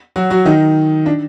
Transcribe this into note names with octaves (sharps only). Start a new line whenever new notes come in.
F#3 F#4
F#3 F#4
D#3 D#4
D4